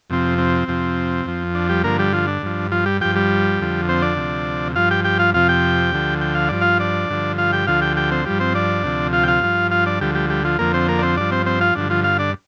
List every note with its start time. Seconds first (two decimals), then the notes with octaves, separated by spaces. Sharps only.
0.10 F2 C3 F3 C4
0.38 C4
0.68 F2 C3 F3
1.26 F2 F3
1.55 D4
1.69 G3 G4
1.84 G2 D3 F3 A#3 A#4
1.99 G3 G4
2.13 F3 F4
2.27 D4
2.42 G2 F3
2.71 F3 F4
2.86 G3 G4
3.01 G2 F3 G4 G5
3.16 G3 G4
3.59 F2 D3 F3
3.89 C4 C5
4.02 D4 D5
4.17 D2 C3 F3
4.76 G2 F3 F4 F5
4.91 G4 G5
5.04 G4 G5
5.19 F4 F5
5.34 F2 C3 F3 F4 F5
5.49 G4 G5
5.92 D2 D3 F3
6.21 G5
6.35 F5
6.49 G2 F3 D5
6.61 F4 F5
6.79 D4 D5
7.09 G2 D3 F3
7.38 F4 F5
7.53 G4 G5
7.67 D2 D3 F3 F4 F5
7.81 G4 G5
7.97 G4 G5
8.11 C4 C5
8.25 G2 F3 G3 G4
8.40 C4 C5
8.55 D4 D5
8.84 D2 C3 F3
9.13 F4 F5
9.23 G5
9.28 F4 F5
9.42 G2 F3
9.71 F4 F5
9.86 D4 D5
10.00 D2 D3 F3 G3 G4
10.15 G3 G4
10.30 G3 G4
10.45 F3 F4
10.59 F2 D3 F3 A#3 A#4
10.74 C4 C5
10.88 A#3 A#4
10.99 D5
11.02 C4 C5
11.17 G2 F3 D4 D5
11.31 C4 C5
11.46 C4 C5
11.61 F4 F5
11.75 G2 D3 F3 D4
11.90 F3 F4
12.04 F4 F5
12.19 D4 D5